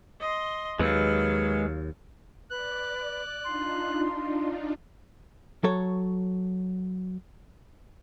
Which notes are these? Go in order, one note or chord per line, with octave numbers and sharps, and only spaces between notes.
D#5 C6
D#2 F#3 G#3 B4 F5 E6
B4 D5 F#6
D4 D#4 F4 C6
F#3 A4 C#5